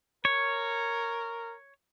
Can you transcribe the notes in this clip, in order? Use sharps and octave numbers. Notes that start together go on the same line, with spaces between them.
A#4 C#5